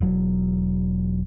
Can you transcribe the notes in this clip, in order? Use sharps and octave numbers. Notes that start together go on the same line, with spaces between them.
E1 F#3